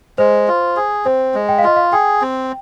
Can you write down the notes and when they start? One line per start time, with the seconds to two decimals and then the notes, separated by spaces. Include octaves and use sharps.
0.18 G#3 C5
0.48 F4
0.76 G#4
1.05 C4 C5
1.34 G#3
1.49 G5
1.59 F5
1.64 F4 D#5
1.76 F5
1.92 G#4 G5
2.21 C4